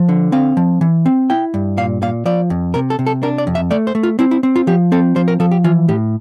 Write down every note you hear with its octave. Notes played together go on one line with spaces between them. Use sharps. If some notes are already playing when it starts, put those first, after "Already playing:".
Already playing: F3
D3
C4 F5
F3
E3
C4
E4 G5
G2
A#2 F5
A#2 F5
F3 D5
F2
C3 A#4
A4
C3
A4
D4 A#4
D5
F2
E5
A3 D5
C5
A3
F4
C4 E4
E4
C4
F4
F3 G4
C4 A4
F3 C5
A#4
F3 A4
G4
E3 F4
A2 G4